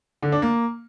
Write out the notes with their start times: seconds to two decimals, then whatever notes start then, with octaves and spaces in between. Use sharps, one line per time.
0.23 D3
0.32 D4
0.42 A#3